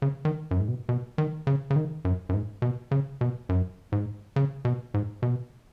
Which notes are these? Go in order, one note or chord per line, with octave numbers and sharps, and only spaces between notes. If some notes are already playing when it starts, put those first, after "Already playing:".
C#3
D#3
F#2
G#2
B2
B2
D#3
C#3
C#3
D#3
F#2
F#2
G#2
B2
C#3
B2
F#2
G#2
C#3
B2
G#2
B2